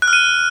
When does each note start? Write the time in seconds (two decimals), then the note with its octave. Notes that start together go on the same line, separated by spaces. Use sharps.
0.02 F#6
0.08 F6
0.13 D#7